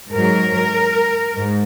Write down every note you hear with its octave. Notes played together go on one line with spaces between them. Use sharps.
G#2 F#3 A#4
G#2